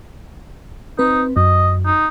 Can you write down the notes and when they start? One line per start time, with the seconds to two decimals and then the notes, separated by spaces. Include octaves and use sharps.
0.99 C4 D#4 B4
1.37 F#2 D#5
1.86 D#4